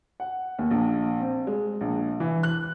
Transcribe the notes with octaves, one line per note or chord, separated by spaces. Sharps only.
F#5
D#2
A#1
C4
G#3
A#1
E3
F#6